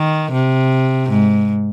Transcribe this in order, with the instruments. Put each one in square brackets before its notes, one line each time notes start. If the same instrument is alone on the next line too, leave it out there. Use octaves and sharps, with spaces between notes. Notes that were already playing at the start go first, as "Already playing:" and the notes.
Already playing: [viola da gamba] D#3
C3
G#2